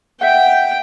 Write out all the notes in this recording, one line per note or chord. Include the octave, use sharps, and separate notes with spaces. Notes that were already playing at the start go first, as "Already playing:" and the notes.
E5 F#5 G5